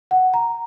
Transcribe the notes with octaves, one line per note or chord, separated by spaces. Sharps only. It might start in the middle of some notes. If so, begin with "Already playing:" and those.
F#5
A#5